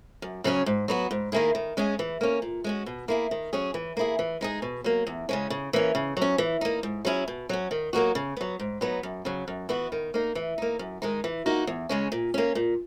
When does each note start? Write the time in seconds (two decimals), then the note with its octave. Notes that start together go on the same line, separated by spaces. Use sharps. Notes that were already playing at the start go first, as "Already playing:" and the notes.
0.22 F#2
0.44 C#3 F#3 C#4 G#4
0.66 G#2
0.88 F#3 B3 F#4
1.11 G#2
1.32 D#3 A#3 E4 G#4
1.55 D#3
1.77 G#3 C#4 G#4
1.99 E3
2.21 A#3 C#4
2.42 A#2
2.64 G#3 C#4 F#4
2.86 B2
3.08 A#3 E4 G#4
3.31 D#3
3.53 F#3 C#4 G#4
3.74 E3
3.97 A#3 E4 G#4
4.19 E3
4.41 G#3 D#4 G#4
4.62 B2
4.84 F#3 A#3
5.07 E2
5.29 C#3 G#3 C#4
5.50 C#3
5.73 E3 A#3 C#4
5.95 C#3
6.17 F#3 C#4
6.38 E3
6.61 A#3 D#4
6.83 G#2
7.05 F#3 C#4 E4 G#4
7.28 B2
7.49 F#3 C#4
7.71 D#3
7.93 F#3 A#3 D#4 F#4
8.15 C#3
8.37 F#3 B3
8.60 G#2
8.81 F#3 B3 D#4
9.03 F#2
9.25 C#3 F#3
9.48 F#2
9.69 E3 B3 F#4
9.92 D#3
10.14 A#3 D#4
10.35 E3
10.58 A#3 D#4
10.79 F#2
11.02 D#3 G#3 D#4
11.24 E3
11.46 A#3 D#4 F#4
11.67 E2
11.89 C#3 G#3 C#4
12.12 A#2
12.34 A#3 C#4
12.55 A#2